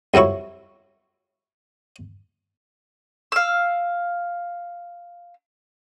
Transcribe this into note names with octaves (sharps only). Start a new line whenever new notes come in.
C2 F2 F#3 E4 C#6
F5 E6